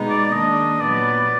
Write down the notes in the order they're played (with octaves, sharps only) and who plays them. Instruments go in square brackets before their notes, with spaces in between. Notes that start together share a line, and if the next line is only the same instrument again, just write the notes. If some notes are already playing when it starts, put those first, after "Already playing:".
Already playing: [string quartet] B2 G#3 B3 D#4
[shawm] D5
[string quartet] D#3 A#3 D4 [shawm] D#5
[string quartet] A#2 F#3 B3 [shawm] D5